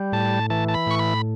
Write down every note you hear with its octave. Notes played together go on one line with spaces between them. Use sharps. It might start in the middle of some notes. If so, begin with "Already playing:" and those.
Already playing: G3
A2 A5
E3 A5
A5
B5
A2 C#6
B5